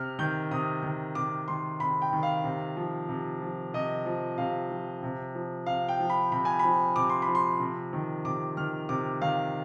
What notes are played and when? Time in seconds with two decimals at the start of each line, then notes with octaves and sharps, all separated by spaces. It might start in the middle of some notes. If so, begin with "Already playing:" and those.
Already playing: C3 F6
0.19 D#3 G6
0.51 C3 D#6
0.83 D#3
1.15 C3 D6
1.48 D#3 C6
1.80 C3 B5
2.02 G5
2.13 D#3
2.23 F5
2.44 C3
2.77 F3
3.09 C3
3.41 F3
3.74 C3 D#5
4.06 F3
4.38 C3 F5
4.70 F3
5.03 C3
5.35 F3
5.66 C3 F5
5.88 G5
5.99 F3
6.10 B5
6.32 C3 B5
6.45 G#5
6.59 B5
6.64 F3
6.96 C3 D6
7.10 C6
7.22 B5
7.28 F3
7.35 C6
7.60 C3
7.93 D#3
8.25 C3 D6
8.57 D#3 F6
8.89 C3 D6
9.22 D#3 F5